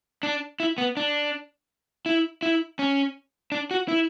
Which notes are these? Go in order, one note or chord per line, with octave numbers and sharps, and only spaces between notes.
D4
E4
B3
D4
E4
E4
C#4
D4
F#4
E4